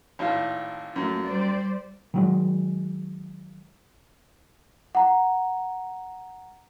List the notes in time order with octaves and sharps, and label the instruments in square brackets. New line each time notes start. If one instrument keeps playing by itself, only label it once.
[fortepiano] G#1 A2 F4
[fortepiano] F#2 [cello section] A3 A#3 F4
[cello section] G3 C5 D5
[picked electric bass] D#3 F#3 G#3
[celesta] F#5 A#5